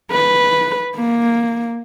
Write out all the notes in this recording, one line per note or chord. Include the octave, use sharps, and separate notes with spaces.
B4
A#3